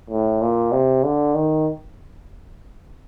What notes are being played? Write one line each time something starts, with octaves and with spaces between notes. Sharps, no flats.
A2
A#2
C3
D3
D#3